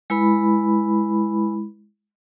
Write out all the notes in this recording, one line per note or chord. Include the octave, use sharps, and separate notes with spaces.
G#3 E4 B4 B5